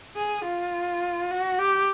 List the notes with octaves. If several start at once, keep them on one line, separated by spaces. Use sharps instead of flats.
G#4
F4
F#4
G4